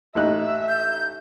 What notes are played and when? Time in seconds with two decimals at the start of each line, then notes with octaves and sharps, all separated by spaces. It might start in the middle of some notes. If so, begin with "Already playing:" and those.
0.15 A1 D#4 E5 F#6
0.68 G6